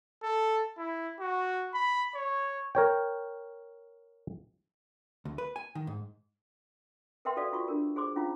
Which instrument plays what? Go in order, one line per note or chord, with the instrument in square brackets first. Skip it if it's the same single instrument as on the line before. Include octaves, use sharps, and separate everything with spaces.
[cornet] A4
E4
F#4
B5
C#5
[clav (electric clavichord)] A#4 C#5 G5
[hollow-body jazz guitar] D2
B4
G#5
D#3
G#2
[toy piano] A#4 B4 E5 G5 C6
F#4 A4 D5 F5
F4 F#4 C#6
D4 A#4
G#4 C5 C6 D6
C#4 E4 F4 F5